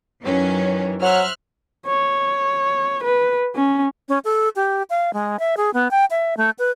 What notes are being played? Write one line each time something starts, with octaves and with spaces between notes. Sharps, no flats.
F#2 D#3 E3 F#3 C#4
F#3 C5 E5 F6 F#6
C#5
B4
C#4
C#4
A4
G4
F5
G#3
E5
G#4
B3
G5
E5
A3
B4